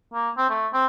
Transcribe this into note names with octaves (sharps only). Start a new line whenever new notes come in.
A#3
C4
A3
C4